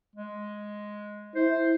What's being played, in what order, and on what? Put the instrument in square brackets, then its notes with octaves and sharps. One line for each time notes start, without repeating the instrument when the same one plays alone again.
[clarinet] G#3
[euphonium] E4 [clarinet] C5